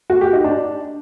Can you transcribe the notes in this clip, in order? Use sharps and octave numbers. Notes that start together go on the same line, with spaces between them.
F#4
G4
D#4
D4